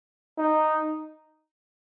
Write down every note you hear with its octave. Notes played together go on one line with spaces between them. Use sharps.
D#4